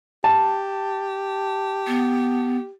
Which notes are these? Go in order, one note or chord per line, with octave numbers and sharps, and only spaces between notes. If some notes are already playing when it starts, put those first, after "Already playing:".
G4 A5
B3